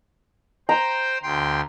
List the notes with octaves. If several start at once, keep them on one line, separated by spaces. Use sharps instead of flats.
C5 G5 A#5
D2 G5 C6